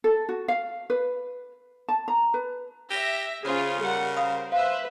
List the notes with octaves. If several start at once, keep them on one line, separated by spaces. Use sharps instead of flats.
A4
F#4
F5
B4
A5
A#5
B4
G4 E5 A#6
C#3 C#4 F4 G#4 C5
G3 A#4 F#5
C5 F5 B5 D#6
B4 C5 E5 F5